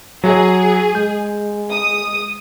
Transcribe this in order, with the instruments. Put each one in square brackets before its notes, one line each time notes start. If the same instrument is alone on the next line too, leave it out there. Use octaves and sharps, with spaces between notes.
[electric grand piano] F#3 [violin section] G#4
[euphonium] G#3 [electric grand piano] G6
[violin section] D#6